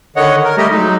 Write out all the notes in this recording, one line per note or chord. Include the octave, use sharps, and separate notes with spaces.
D3 D#3 C#5 D#5 F#5
A#4
G3 A3 G4 D#5
F#3 G#3 D#4